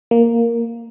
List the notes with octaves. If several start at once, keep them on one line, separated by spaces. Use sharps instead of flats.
A#3